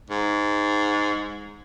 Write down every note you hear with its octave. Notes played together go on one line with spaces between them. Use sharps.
G#2